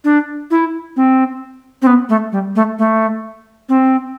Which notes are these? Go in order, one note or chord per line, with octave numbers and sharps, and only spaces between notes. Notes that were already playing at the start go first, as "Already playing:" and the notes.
D4
E4
C4
C4
B3
A3
G3
A3
A3
C4